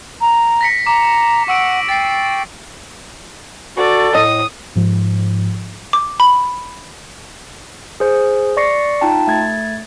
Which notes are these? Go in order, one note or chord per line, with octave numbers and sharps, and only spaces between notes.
A#5
A#6 B6 C#7
A#5 D6
F#5 C#6 E6 D7
G5 A6 C7
F#4 A4 D5
A2 D#5 D#6
G#2 F3
D6
B5
G#4 C5
D5 C#6 A#6 C7 C#7
D#4 F4 G5 A5
A3 G#6 A6